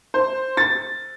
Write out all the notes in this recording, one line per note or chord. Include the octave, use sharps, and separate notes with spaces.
C5
A6